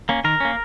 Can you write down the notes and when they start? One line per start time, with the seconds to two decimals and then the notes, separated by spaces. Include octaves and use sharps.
0.09 A#3 C#4
0.24 D#3 A#4
0.40 A#3 C#4